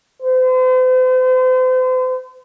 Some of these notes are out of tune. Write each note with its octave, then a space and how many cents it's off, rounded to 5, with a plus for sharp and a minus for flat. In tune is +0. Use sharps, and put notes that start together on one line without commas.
C5 -40